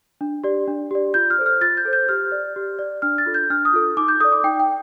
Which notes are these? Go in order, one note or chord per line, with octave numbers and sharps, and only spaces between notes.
D4
G4 D5
D4
G4 D5
F4 G6
F6
A4 C5
F6
F4 A6
G6
A4 C5
G6
G4 F6
D5
G4
D5
D4 F6
A6
F4 A4
G6
D4 F6
D#6
F4 A4
D#4 D6
G6
A4 D5 D#6
D6
D#4 G5
G5